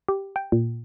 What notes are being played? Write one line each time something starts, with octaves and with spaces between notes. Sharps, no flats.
G4
G5
A#2